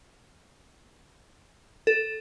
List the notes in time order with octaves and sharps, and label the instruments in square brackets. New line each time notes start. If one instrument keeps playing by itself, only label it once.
[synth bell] A4